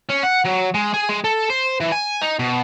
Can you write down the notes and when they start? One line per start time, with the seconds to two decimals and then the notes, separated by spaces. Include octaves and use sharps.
0.09 C#4
0.23 F#5
0.44 F#3
0.74 G#3
0.94 G#4
1.09 G#3
1.24 A4
1.50 C5
1.80 E3
1.92 G#5
2.21 D#4
2.39 B2